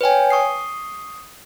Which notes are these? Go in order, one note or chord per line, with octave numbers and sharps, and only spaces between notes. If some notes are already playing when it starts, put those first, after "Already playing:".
B4 C#5 G5 G#5
C#6 D#6 C7